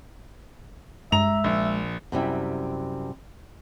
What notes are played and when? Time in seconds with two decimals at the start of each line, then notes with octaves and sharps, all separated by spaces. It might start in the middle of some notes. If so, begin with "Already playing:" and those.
1.12 G2 G#3 E5 A#5 F7
1.44 A#1
2.12 F#2 C3 G3 E4